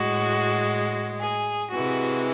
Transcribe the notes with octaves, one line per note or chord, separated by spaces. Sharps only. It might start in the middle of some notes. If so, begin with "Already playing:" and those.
Already playing: A2 G#3 F#4
G#4
C3 E3 G#3 F#4